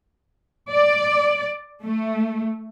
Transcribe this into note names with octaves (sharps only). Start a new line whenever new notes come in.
D5
A3